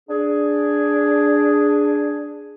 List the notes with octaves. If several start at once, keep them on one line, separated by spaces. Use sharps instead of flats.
D4 G#4